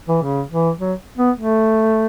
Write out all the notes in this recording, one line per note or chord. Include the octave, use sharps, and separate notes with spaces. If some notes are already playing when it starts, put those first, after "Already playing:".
E3
C#3
E3
F#3
B3
A3